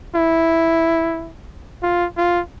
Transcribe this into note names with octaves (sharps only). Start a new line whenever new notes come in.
E4
F4
F4